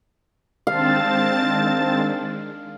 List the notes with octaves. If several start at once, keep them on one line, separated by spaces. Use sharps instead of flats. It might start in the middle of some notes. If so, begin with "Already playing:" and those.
D#3 G#3 C4 D4 F5 A5 A6